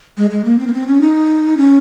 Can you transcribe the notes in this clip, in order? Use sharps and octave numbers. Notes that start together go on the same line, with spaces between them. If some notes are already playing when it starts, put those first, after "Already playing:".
G#3
G#3
A#3
C4
A#3
C4
C#4
D#4
C#4